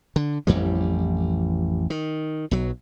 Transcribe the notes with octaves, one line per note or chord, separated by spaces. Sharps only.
D3
A1 F2 E3 G3
D#3
B1 F#3